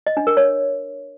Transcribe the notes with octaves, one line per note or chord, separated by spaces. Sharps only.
D#5
D4
A#4
C#5